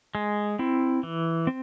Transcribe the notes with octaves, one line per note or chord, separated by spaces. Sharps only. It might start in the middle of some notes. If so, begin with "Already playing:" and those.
G#3
C4 E4
E3
C4